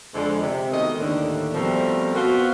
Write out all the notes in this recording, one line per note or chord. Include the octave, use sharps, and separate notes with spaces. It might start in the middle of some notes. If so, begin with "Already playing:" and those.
F2 D3 G#3
C3
B2 D#3 G#3 A3 D#5
D#2 A2 D3
B2 F3 G3 A3 C4 A#4
B2 A#3 C4 F4 F#4